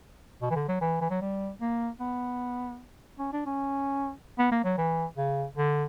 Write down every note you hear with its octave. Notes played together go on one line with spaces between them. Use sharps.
B2
E3
D3
F#3
E3
E3
F#3
G3
A#3
B3
C#4
D4
C#4
B3
A#3
F#3
E3
C#3
D3